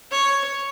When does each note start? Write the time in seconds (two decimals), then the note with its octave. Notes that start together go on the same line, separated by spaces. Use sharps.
0.11 C#5